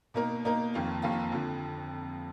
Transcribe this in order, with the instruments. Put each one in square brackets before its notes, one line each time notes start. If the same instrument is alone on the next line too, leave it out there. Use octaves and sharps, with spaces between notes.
[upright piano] B2 A#3 D#4 A#4
B2 A#3 D#4 A#4
F1 F2 D#3 A#3 F4
F1 F2 D#3 A#3 F4
F2 D3 F3